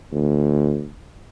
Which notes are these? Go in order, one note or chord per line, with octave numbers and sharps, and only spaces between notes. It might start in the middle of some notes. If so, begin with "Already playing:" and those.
D2